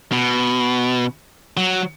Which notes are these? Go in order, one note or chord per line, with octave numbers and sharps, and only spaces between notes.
B2
F#3